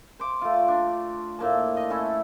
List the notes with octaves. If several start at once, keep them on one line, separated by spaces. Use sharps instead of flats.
C5 D6
A3 F4
D4
A2 A#3 A5
D#5
A3 C#4 E4 A4